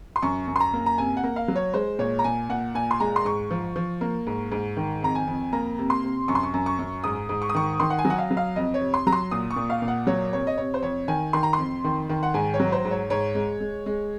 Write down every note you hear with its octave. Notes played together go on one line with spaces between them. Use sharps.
C6
F#2 C#6
F#2
C6
A#5
A#3
A#5
C3 G#5
F#5
A#3
F5
F#3
C#5
G#3 C5
A#2 C#5
A#5
A#2 G#5
A#2 F#5
A#2 G#5
C6
G#3 A#5
C6
G#2 C#6
F3
F3
A#3
G#2
G#2
D#3
F2 A#5
G#5
F2
A#3 A#5
C3
C6
C3
F#2 C#6
C6
C#6
F#2
C#6
F#2
G#2 D#6
G#2
C#6
D#6
D#3 C#6
D#3 C6
F#5
G#5
F#3
F#5
F5
F#3
F5
F2 D#5
C#5
C3
C6
F#3 A#5
C6
A#2 D#6
C#6
A#2
F5
A#2
F#5
F#3 C#5
C3 C#5
D#5
C3 C#5
C5
F2 C#5
D#3 G#5
D#3 C6
A#5
F2 C6
D#3
D#3
F#5
G#2 G#5
C#5
F#3
C5
G#2
C#5
G#2 C#5
G#3
G#3
G#3